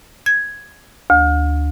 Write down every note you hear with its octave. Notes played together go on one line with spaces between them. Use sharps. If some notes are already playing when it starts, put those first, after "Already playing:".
G#6
D2